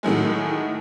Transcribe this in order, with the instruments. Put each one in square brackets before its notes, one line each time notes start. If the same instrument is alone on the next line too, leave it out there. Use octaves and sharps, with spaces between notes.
[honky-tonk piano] A2 D#3 F#3 G#3